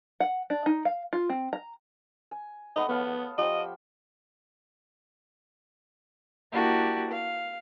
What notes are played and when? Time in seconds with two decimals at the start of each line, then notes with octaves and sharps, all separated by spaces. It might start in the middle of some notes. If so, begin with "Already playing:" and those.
0.20 F#5
0.50 D4
0.66 D#4
0.85 F5
1.13 F4
1.30 C4
1.53 A#5
2.31 G#5
2.76 A3 B3 D#5 F#5
2.89 B3 C#5 F5 A5
3.38 F3 G4 D#5 G5
6.52 A#3 D4 E4 F#4 G4
7.10 F5